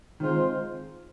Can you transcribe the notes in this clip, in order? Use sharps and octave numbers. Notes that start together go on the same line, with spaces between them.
D#3 G#3 C4 F4 C5